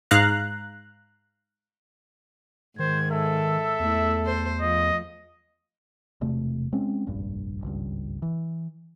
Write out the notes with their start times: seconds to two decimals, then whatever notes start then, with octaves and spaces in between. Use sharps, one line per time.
0.11 G#2 F5 A#5 F#6
2.79 G#2 D#3 C5 G#6
3.11 A4 E5
3.80 E2 A3 E4
4.26 C5
4.61 F3 D#5
6.21 E1 C3 A3
6.72 G#3 C4 C#4
7.07 F1 A#1 G2
7.62 G#1 C#2 G2
8.22 E3